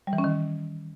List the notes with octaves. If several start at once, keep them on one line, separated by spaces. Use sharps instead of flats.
G3
E3
C#4
D#3